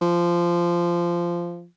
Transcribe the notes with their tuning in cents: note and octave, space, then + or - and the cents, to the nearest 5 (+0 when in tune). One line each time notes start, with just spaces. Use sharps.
F3 -15